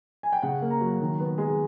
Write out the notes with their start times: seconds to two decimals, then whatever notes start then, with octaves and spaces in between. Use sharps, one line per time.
0.23 G#5
0.32 G5
0.42 C#3 F#5
0.62 A#3
0.71 A#5
0.80 F#3
1.01 D#3
1.20 B3
1.38 G#3